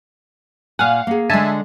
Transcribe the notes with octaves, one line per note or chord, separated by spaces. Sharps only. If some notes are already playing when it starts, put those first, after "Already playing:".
A#2 F5 F#5 G#5
A#3 G#4
D3 G#3 E5 G#5 A5